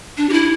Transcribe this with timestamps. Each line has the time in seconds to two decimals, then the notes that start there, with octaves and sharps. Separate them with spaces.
0.17 D4
0.29 G4
0.33 E4